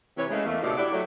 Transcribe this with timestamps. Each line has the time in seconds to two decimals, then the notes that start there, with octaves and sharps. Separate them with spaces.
0.17 C3 E3 C#5
0.30 C#3 G#3 A3
0.45 E2 A3 A#3
0.62 D2 A2 C3 D#4 A4 D5
0.77 E4 F#4 G4 D5
0.92 F#3 A3